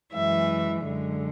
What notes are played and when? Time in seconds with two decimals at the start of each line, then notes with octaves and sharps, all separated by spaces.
0.13 F#2 E3 G#3 E5
0.84 F#2 D3 G#3